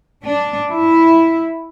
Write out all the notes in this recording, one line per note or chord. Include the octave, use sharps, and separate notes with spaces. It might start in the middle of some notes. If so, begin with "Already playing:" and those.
D4
E4